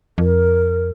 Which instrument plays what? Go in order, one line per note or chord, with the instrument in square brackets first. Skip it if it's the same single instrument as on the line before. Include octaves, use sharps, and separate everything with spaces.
[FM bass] F2 [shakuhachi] A#4